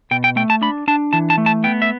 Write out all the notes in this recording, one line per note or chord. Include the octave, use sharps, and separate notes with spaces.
B2 G5
G5
A3 G5
A5
D4 B5
D4 A5
E3 A5
A5
A3
A5
B3 G5
E5